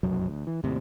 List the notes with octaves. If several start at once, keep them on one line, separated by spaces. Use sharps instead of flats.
F1 B1 F#2 F#3
D2
E3
D#2 A2 C3